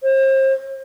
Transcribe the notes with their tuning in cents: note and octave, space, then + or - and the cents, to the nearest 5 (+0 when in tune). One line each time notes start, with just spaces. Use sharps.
C5 +35